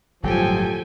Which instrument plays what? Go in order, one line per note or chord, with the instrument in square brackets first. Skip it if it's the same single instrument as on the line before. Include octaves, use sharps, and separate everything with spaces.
[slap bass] G1 A2 F#3 [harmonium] F3 [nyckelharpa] G4 A4 [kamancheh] G5 G#5